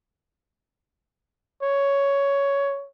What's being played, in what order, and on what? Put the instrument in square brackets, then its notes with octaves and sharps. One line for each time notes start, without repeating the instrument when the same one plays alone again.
[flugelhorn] C#5